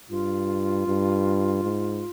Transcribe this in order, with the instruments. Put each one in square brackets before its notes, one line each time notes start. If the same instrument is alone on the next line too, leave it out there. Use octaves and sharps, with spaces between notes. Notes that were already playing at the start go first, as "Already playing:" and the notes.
[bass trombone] G2 [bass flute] F4
[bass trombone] G2
G#2